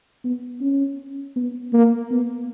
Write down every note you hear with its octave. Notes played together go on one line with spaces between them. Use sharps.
B3
C#4
B3
A#3
B3